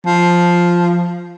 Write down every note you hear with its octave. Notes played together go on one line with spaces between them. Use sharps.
F3